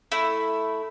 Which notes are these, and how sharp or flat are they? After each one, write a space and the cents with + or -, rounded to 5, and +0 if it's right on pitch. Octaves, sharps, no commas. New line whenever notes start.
A3 +0 E4 +0